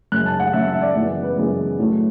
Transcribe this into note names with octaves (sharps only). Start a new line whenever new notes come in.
F#2 C#3 G#3 F#6
A5
F#5
F#2 C#3 G#3 E5
E5
D5
F#2 C#3 E3 G#3 B3 D5
B4
F#2 C#3 E3 G#3 B3 B4
A2 F#3 A3